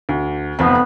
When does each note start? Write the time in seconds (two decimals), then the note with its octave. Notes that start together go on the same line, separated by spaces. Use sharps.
0.09 D2
0.59 F1 F2 B3 C4